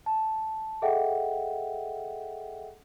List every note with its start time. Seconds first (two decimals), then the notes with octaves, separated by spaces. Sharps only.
0.06 A5
0.82 G#4 A4 D#5 E5 F#5 G5